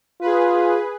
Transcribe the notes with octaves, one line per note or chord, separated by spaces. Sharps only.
F4 G#4 B4